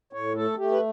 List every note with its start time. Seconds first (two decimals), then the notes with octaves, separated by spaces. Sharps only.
0.13 A2 C#5
0.35 A3 A4
0.58 A3 G4
0.72 B4